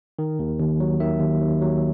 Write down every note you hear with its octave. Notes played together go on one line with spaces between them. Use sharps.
D#3
D#2
D#2
F#3
D#3 E5
D#2
D#2
F#3